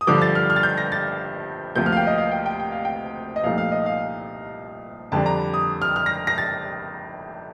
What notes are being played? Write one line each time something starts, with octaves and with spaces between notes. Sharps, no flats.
D#6
G2 D3 F3 D6
A6
F6
F6
A6
G6
A#6
A6
D2 C3 F3 A#3 G6
F6
F5
G5
D#5
F5
G5
G5
G5
F5
G5
D#5
C2 A#2 F3 A3 D#4 F5
F5
D#5
F5
F2 D3 G3 D4 A5
A#5
D#6
F6
F6
A#6
A#6
A6